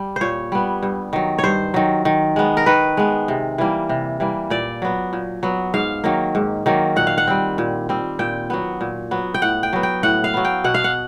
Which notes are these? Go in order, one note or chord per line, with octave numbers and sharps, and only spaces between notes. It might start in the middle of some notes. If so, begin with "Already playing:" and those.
Already playing: G3
A#2 C5 C#5
G3 B3
G2
D#3 F#3
C#5
G2 C5
D#3 F#3
D#3
G#3 B3
A#4
D#3 B4
G#3 B3
C3
E3 G3 A#3
C3
E3 G3 A#3
A#2 D5
F#3 B3
A#2
F#3 B3
G#2 F5
D#3 F#3 A#3
G#2
D#3 F#3 A#3
A#2 F#5
F5
F#5
G3 C4
A#2
G3 C4
A#2 G5
F#3 B3
A#2
F#3 B3
G5
A2 F#5
G5
F#3 B3
G5
A2 F#5
F5
F#3 B3
G5
B2 F#5
F5
F#5